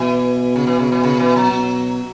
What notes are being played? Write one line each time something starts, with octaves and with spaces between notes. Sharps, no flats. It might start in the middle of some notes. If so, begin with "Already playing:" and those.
Already playing: B2 E3
C#3
E3
C#3
E3
C#3
E3
F#3
B2